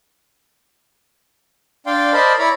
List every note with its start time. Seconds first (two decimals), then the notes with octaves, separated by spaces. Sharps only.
1.86 D4 D5 F5 G5 C6
2.13 A#4 C5 D5 D#5 A5 B5
2.39 E4 C#5 D5 A#5 B5